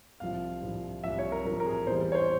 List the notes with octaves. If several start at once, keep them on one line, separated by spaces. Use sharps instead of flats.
C2 C3 F3 F5
C2 C3 F3
C2 C3 F3 E5
C#5
A#4
C2 C3 F3 A#4
A#4
G#4
E2 E3 G3 C5
C#5
C5